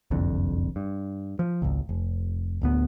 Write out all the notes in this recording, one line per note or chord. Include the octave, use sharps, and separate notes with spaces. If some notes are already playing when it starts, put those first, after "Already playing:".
F#1 C2 F2 D3
G2
F3
G#1 C#2
F1
D1 D2 B3